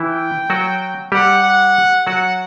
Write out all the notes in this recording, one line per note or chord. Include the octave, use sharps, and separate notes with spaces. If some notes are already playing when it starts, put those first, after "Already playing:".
Already playing: E3 E4 G5
F#3 F#4
G3 G4 F#5
F#5
F#3 F#4 F#5